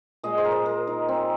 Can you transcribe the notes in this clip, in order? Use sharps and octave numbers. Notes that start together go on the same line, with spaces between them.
A#2 G#3 D#5
C5
A#4
C5
A#4
D#4
C4